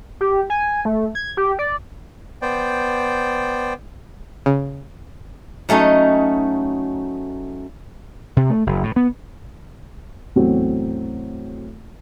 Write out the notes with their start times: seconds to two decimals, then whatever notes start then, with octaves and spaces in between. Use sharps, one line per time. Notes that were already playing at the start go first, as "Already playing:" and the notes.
0.21 G4
0.50 G#5
0.85 A3
1.15 G#6
1.37 G4
1.59 D5
2.42 B3 C5 D5 G5
4.46 C#3
5.69 F#3 A3 C#4 D#4
8.37 C3
8.50 A3
8.67 F#1
8.83 A2
8.96 B3
10.36 E2 A2 F#3 C4